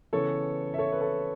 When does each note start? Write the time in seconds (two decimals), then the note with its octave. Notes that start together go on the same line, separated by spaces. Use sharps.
0.13 C#3 E3 B3 A4 C#5
0.74 E5
0.78 A4 C#5
0.92 B4
1.01 A4 C#5